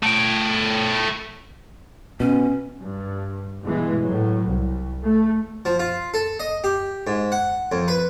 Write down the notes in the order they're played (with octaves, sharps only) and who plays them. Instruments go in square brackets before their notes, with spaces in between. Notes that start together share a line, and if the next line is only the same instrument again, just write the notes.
[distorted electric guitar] A3 G5
[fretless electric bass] B2 [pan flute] C#4
[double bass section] G2
G2 B2 E3 G#3
A2 F#3
C2
A3
[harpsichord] F3
F4
A4
D#5
G4
G#2
F#5
F2
B4